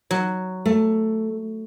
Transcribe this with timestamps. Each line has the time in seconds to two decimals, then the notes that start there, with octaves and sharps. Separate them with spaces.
0.11 F#3
0.66 A3